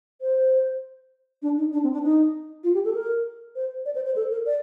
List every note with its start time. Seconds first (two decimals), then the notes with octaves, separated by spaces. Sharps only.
0.21 C5
1.42 D4
1.58 D#4
1.73 D4
1.83 C4
1.93 D4
2.03 D#4
2.64 F4
2.74 G4
2.85 A4
2.95 A#4
3.56 C5
3.85 D5
3.95 C5
4.06 C5
4.16 A4
4.31 A#4
4.46 D5